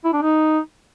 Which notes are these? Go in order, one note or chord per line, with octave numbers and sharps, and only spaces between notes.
E4
D4
D#4